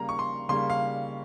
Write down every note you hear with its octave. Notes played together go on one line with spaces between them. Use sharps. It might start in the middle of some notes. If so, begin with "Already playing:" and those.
Already playing: C#3 G3 A#3 A#5
C#6
C6
C#3 G3 A#3 C6
F5